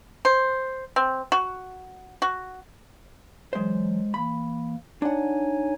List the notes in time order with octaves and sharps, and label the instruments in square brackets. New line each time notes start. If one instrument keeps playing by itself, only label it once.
[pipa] C5
C4
F#4
F#4
[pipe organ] E3 F#3 [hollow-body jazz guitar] G#3 C5
[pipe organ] E3 A#3 [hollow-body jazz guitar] B5
[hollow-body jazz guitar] D4 F#5 [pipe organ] D#4 C#5 G#5